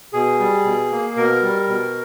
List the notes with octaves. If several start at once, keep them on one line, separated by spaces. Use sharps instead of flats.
B2 G#4
G3
B2
A#3
B2 A#4
G3
B2